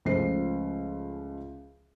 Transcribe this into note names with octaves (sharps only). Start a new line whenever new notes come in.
C#2 F3 A3 C5 C7